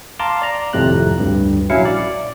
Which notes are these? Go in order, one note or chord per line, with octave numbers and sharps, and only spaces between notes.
F5 A5 A#5 C6 D6
D5 A#5
G#1 F2 A2 C3 F#6
D2 G2
A#1 F#3 C#4 E4 F5 C#7
D5